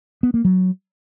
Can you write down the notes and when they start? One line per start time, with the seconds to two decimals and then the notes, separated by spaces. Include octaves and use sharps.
0.23 B3
0.34 A#3
0.45 F#3